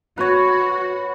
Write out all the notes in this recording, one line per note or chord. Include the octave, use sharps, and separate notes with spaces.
F#4 B4 C#5